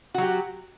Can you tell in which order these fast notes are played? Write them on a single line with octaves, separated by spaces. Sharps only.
F#4 F#3 G4